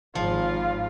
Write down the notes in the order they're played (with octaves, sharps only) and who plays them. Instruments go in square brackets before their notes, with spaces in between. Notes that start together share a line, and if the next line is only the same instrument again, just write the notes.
[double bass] G#1 [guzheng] F3 [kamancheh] F4